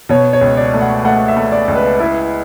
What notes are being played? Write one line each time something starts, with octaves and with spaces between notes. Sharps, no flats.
B2 C#5
C#5
C#2
D5
A3
F#5
A3 F#5
E5
A3
D5
C#2
B4
E4 B4